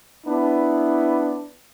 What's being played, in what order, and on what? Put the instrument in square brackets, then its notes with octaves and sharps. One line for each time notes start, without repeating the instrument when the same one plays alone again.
[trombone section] B3 D4 E4